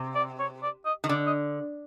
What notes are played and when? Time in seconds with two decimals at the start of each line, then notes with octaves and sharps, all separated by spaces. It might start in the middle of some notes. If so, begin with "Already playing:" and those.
Already playing: C3
0.15 D5
0.40 C#5
0.63 D5
0.85 D#5
1.04 D#3
1.09 D3 D5
1.27 D#5